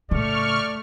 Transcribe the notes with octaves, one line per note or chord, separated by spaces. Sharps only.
A2 C#3 A3 D5 C#6 F6